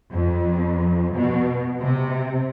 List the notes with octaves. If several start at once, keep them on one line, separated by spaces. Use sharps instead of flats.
F2
B2
C3